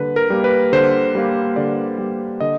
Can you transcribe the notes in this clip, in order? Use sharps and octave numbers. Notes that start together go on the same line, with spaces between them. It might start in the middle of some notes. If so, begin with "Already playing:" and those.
Already playing: D3 G3 A#3 B4
A#4
G3 A#3
B4
D3 C5
G3 A#3
D3 D5
G3 A#3
D3 D#5